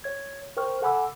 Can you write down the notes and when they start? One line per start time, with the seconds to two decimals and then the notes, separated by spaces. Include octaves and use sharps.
0.04 C#5 G#6
0.57 A#4 C5 G5 C#6 F6
0.82 A4 F#5 G#5 B5 D6 E6